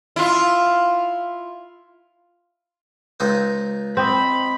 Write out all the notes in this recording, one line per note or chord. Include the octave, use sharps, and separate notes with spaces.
E4 F4
C#2 D#4 C5
C4 D#5 B5